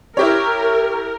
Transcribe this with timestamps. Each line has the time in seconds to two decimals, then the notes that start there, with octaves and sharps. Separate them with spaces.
0.17 E4 G4 A#4 C#5